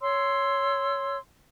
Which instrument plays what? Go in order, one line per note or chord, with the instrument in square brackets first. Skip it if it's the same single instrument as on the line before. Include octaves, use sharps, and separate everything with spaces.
[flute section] C#5 C6 E6